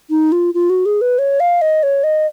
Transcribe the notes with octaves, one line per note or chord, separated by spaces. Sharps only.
D#4
F4
F4
F#4
G#4
B4
C#5
F5
D#5
C#5
D#5